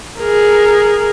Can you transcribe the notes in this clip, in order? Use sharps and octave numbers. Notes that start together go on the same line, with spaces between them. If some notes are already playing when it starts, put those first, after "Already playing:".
G#4 A#4